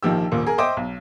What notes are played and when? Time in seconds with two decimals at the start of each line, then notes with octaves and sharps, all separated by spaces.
0.03 A#1 D#3 F3 G4 E6
0.32 D#1 A#2
0.47 G#4 A#4
0.58 C5 D#5 E5 G5 D6
0.77 B1